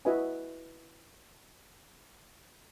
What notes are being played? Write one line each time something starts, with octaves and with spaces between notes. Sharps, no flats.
E4 F#4 B4 D#5 E5 G#5